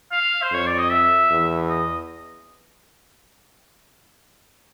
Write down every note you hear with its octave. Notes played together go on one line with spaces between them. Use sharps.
F5
C5
F2 C#5
D5
D#5
E5
E2
D#5